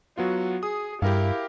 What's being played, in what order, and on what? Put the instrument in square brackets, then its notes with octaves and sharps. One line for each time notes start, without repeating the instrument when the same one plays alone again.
[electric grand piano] F#3 B3 F4 [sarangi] F#4
[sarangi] G#4 [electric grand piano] D#6
[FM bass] G2 [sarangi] E4 [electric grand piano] G4 A#4 F5